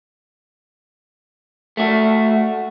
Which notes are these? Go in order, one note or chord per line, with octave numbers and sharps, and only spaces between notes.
A3 F#4